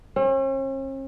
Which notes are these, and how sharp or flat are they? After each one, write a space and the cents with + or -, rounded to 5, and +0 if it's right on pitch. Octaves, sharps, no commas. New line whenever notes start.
C#4 -45